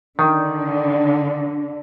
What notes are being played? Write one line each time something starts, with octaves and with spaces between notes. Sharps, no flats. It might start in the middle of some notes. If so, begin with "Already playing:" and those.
D3 D#3